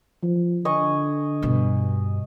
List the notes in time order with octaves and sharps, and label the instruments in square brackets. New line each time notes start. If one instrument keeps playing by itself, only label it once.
[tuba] F3
[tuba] D3 [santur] D#5 G#5 C#6
[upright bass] G2 B2